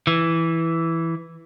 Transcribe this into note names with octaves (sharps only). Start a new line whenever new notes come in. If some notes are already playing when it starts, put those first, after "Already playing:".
E3